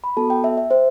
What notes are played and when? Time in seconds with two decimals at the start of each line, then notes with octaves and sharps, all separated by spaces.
0.04 B5
0.17 B3 F#4 A4 A5
0.30 G5
0.44 E5
0.57 E5
0.71 C5